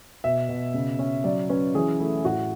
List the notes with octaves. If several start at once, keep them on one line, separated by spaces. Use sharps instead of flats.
B2 E5
B2
C#3
C#4
F#3 D5
C#4 B4
E3 G#4
A3 E4
A2 F#4